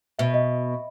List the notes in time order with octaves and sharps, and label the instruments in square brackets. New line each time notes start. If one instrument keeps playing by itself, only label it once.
[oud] B2 [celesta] E5
[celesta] D#5